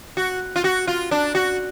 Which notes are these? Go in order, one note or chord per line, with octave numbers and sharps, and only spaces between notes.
F#4
F4
F#4
F4
D4
F#4